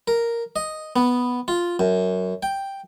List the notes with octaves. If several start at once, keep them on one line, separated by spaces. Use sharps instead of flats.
A#4
D#5
B3
F4
F#2
G5